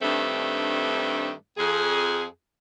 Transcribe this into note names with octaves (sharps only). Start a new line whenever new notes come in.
G2 D#3 A3 C4 D4
F2 G#4